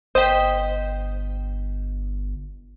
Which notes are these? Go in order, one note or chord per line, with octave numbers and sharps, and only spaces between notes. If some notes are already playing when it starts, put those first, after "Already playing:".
G1 C5 D#5 G5 B6